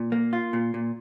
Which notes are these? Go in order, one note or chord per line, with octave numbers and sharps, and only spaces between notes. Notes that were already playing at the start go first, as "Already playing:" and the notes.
Already playing: A#2
A#3
F4
A#2
A#2